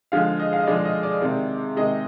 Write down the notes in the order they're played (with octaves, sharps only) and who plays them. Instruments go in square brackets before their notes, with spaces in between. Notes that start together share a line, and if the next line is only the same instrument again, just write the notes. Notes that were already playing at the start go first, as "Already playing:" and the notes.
[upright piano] D3 F3 G#3 F5
D#5
F5
D#5
D3 F3 G#3 D5
D#5
D5
C3 D#3 G#3 D5
C3 D#3 G#3 D#5